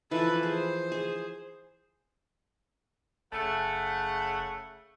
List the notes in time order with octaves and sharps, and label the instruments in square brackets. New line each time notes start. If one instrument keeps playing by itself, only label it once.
[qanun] E3 F3 G#5 [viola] A4 B4
[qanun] G#4 [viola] C5
[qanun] G#4
[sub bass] F#1 [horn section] C#3 A3 F#5